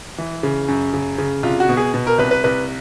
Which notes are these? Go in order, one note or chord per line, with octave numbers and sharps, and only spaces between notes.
E3
C#3
F#2
C#3
C#3
C2 F4
F#4
B2
G#4
B2
A#4
C2 B4
B4
C2 B4